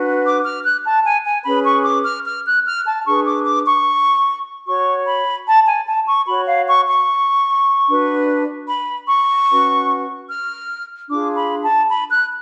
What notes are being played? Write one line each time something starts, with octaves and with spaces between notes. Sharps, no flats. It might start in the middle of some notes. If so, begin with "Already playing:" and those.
Already playing: D4 F#4 B4
D6
F6
F#6
A5
G#5
G#5
C#4 G#4 B4 B5
C#6
D6
F6
F6
F#6
F6
A5
D4 G#4 B4 C#6
D6
D6
C#6
F#4 C#5 C#6
B5
A5
G#5
A5
C#6
F#4 C#5 B5
F5
C#6
C#6
D4 F#4 B4
B5
C#6
C#4 F#4 B4
F6
D4 F4 G#4 D6
B5
A5
B5
F#6